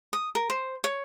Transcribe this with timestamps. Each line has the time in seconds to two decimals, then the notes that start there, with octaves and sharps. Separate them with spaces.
0.13 D#6
0.35 A#4
0.50 C5
0.84 C#5